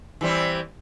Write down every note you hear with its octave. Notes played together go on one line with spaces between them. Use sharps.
E3 G3 C4